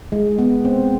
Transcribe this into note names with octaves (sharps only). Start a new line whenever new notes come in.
G#3
B3
C4